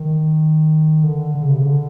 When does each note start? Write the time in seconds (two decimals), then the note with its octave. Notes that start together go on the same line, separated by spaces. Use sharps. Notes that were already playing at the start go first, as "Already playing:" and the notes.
Already playing: D#3
1.04 D3
1.35 D3
1.43 C#3
1.49 C3
1.57 C#3
1.66 D3